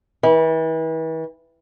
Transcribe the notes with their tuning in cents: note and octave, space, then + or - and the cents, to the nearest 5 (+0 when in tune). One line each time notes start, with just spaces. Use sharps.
E3 -35